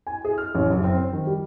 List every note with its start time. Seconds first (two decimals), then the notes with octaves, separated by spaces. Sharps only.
0.07 G#5
0.25 G#4
0.38 F6
0.55 A1
0.70 F#1
0.84 C4
0.97 C5
1.13 D#3
1.27 G3